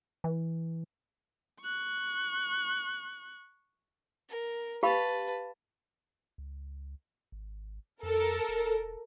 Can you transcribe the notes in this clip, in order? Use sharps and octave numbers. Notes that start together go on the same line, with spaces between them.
E3
C#6 F#6
A#4
G4 B4 F5 A5 B5
C#2
G#1
F2 A4 A#4
E1